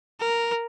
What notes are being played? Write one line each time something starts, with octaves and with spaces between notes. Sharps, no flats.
A#4